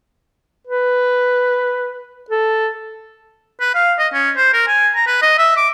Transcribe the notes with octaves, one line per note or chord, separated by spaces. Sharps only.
B4
A4
B4
F5
D#5
C#4
C5
A#4
G#5
A#5
B4
D#5
E5
D6